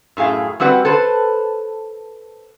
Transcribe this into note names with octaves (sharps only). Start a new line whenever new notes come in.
F#2 A2 G#4 F5 G5
G3 C4 F#4 B4 F#5
A4 B4 C5